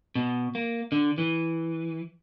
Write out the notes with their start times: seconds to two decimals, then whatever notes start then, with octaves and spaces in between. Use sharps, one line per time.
0.15 B2
0.55 A#3
0.92 D3
1.18 E3